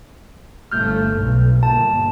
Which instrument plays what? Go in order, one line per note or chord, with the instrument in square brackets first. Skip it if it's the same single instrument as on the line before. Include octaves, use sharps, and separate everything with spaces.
[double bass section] G1 A3 [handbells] F6 G6
[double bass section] B1
[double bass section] G1 A#2 [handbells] A5